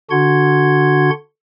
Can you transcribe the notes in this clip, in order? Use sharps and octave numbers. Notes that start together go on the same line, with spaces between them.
D3 D4 F#4 F#5 C6 G#6